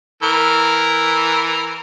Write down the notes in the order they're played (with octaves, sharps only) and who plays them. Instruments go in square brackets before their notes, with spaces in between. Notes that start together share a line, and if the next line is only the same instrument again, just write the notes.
[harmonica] E3 A#4